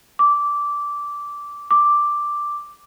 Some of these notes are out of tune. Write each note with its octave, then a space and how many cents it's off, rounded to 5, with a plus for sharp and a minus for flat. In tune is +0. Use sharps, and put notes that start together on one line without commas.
D6 -10
D6 +5